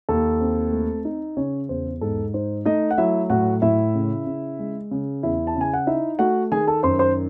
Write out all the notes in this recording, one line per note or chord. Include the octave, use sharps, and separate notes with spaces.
D#2 A4
C4
A3
D#4
C#3 C#4 C#5
E2 C5
G#2 A4
D#4 C5
A3 D#4 D#5
F#5
F#3 E4 E5
A2 F#4 F#5
A2 E4 E5
C#3
C#3
G#3
C#3
E2 E4 E5
A5
C#3
G#5
F#5
D#4 E4 E5
A3 F#4 F#5
D#3 G#4 G#5
A4 A5
F#2 C5 C6
C5 C6